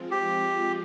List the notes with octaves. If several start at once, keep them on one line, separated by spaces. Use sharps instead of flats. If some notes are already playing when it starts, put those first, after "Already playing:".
Already playing: F3 G#3 C4 F4
G4